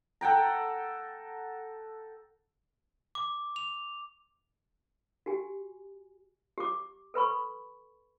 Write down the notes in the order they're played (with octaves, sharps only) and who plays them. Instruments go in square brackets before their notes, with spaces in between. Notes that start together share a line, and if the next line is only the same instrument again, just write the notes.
[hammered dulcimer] A4 F#5 G5 A#5
[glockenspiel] D6
F7
[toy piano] F#4 G4 G#5
G4 D6
A4 B4 B5 C#6